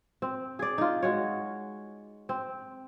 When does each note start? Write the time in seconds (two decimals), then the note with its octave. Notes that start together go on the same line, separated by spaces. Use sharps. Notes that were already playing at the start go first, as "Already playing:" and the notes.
0.22 C4
0.59 G#4 D5
0.78 D#4 F4
1.03 G#3 F#4 C#5
2.29 C4